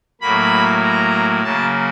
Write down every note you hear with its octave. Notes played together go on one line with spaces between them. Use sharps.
A2 F#3 A#3 B5
A#5
C#3 F#3 A#3 A5